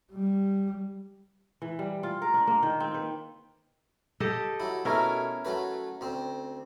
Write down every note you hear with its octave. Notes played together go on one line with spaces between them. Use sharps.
G3
E3
G3
F4
A#4
D4
A#3
D#3
C4
B4
G4 A4 D#5
F#3 E4
B2 A3 C#4 E4 A#4
F#3 A3 B4
D2 C4